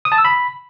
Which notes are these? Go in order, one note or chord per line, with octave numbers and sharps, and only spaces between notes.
D#6
A5
E6
B5